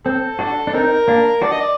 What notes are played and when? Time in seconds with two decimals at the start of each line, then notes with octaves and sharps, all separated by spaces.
0.05 C4 A4
0.39 D4 F#4
0.67 D4
0.74 C4 D#4 A#4
1.08 A#3 D4
1.42 D4 F#4 D5
1.52 D#5
1.60 D5